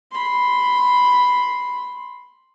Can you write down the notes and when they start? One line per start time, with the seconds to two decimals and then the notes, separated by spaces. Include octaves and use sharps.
0.12 B5 C6